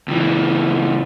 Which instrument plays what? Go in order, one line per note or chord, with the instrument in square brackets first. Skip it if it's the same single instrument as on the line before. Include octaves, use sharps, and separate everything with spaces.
[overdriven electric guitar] C#2 E3